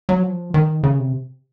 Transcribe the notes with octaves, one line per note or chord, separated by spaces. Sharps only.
F#3
F3
D#3
C#3
C3